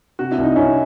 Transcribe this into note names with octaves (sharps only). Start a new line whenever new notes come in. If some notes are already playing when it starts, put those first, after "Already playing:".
C3 F#4
E4
C2
D#4
C2 C#4 E4